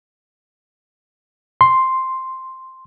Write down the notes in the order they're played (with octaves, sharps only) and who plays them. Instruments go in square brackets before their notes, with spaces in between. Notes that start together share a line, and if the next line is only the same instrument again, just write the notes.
[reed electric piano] C6